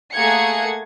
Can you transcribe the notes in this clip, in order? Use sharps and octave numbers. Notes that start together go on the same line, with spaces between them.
A3 A#3 G#4 F#5 G#6 C#7